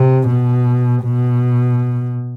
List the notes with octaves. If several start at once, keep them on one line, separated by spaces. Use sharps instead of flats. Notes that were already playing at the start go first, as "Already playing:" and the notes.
Already playing: C3
B2
B2